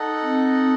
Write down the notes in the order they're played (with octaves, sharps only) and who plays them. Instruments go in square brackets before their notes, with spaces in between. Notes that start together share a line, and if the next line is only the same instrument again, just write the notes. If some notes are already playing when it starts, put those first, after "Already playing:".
Already playing: [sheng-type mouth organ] D#4 A4 D#5 F#5
[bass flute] C4